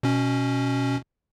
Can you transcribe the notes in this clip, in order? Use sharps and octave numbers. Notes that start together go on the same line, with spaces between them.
B2 C#4